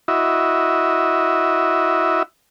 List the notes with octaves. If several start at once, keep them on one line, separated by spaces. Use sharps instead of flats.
E4 F#4 D#5 E5